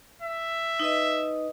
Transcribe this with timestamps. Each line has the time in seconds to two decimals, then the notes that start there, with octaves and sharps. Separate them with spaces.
0.22 E5
0.80 D#4 B4 D#5